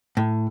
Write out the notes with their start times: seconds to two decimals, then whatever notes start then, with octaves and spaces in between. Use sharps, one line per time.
0.17 A2